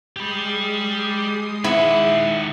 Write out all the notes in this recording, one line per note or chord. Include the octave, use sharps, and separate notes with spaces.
G#3 G4 B5 D#6 C7
D#3 E4 F#5